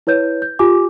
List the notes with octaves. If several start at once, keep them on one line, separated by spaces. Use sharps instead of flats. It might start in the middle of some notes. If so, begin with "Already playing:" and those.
E4 B4 C#5 G6
G6
F4 G4 G#5 D6